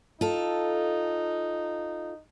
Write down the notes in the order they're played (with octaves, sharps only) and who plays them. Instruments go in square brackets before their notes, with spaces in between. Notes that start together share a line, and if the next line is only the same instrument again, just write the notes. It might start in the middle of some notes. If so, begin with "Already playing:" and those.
[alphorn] D#4 [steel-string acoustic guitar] F4 A4